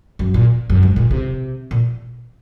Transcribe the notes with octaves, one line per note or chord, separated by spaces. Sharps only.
F#2
A#2
F#2
G#2
A#2
C3
A#2